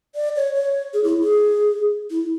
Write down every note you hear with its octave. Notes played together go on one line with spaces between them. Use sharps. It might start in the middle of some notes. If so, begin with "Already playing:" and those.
D5
C#5
C#5
G#4
E4
G#4
E4